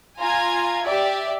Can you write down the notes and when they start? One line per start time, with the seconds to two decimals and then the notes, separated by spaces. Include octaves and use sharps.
0.19 F4 G#5 A#5 G#6
0.85 G4 D5 E5